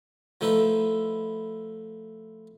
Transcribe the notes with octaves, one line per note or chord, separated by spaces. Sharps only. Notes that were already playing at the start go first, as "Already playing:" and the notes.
F3 A3 D#4 E4 B4